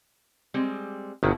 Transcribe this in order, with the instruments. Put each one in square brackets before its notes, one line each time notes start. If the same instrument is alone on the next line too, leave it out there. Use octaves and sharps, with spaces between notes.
[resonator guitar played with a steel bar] G3 G#3 C4
[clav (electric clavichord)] G1 D#3 [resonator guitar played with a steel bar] B2 E4 F#4